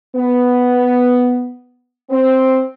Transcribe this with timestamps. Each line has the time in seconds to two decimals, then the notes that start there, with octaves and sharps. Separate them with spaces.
0.15 B3
2.10 C4